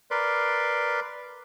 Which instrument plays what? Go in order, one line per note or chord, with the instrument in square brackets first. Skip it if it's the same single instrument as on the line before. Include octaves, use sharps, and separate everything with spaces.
[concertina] A#4 B4 D5 C6